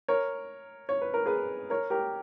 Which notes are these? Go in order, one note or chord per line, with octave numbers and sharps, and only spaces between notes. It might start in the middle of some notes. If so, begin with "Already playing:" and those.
A#4 C#5
C#5
B4
A#4
G#4 B4
A#4 C#5
G4 A#4